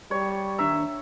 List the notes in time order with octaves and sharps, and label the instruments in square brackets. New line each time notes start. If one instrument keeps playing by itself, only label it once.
[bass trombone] G3 [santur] C#5
[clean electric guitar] D#2 D4 A#5 [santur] E5